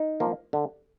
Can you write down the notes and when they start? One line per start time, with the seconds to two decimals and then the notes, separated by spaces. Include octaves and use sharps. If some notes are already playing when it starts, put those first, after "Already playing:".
Already playing: D#4
0.20 F3 A#3
0.53 D3